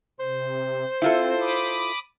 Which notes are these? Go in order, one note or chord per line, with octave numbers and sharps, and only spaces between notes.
C3 C5
C4 E4 F4 A4
B5 D6 D#6